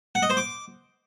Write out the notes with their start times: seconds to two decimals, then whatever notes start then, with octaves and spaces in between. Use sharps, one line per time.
0.15 F#5
0.22 D#5
0.30 C5
0.37 D6